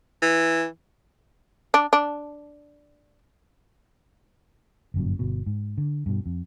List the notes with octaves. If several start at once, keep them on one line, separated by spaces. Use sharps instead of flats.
E3
D4
D4
G1 F#2 A#2
G1 B2
G#2
D3
G2 B2
F2